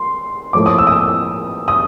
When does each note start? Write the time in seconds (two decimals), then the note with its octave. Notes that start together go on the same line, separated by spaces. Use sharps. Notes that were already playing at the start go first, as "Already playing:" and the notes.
Already playing: C6
0.53 A2 F3 A#3 D6
0.66 D#6
0.78 E6
0.87 D#6
0.92 E6
1.68 D#6